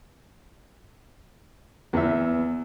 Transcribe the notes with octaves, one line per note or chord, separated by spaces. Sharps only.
E2 B3 E5